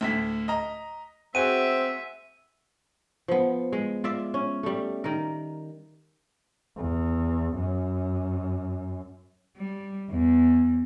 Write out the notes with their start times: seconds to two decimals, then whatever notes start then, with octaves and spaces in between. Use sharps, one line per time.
0.01 D2 A2 B6
0.48 D#5 A#5
1.35 C4 F#4 G#4 E5 D#7
3.28 F3 B3
3.73 G#3
4.04 F4 D5 E5
4.34 C#4
4.63 G3 A3
5.04 D#3 A#4
6.76 E2
7.55 F#2
9.57 G3
10.11 E2